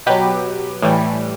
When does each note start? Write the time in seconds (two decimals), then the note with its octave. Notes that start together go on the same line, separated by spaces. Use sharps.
0.06 B2 F#3 G4 B4
0.82 A2 E3 G3